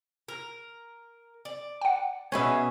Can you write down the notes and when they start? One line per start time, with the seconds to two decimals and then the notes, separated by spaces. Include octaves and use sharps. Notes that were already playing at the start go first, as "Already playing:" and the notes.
0.28 A#4
1.45 D5
1.81 F#5 G5
2.32 B2 C#4 G#4 B4 E5